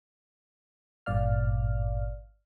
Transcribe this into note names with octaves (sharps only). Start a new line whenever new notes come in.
G#1 G2 A#2 D5 F5 F6